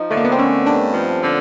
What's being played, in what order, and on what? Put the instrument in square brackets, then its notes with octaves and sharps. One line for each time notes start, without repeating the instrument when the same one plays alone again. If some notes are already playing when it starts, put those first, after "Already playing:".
Already playing: [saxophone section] F3 [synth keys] D#4
[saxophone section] D3 [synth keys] A3
[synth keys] A#3
B3
C4
[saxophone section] A3 [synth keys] C#4
[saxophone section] G2 [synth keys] D4
[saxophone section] F3
D3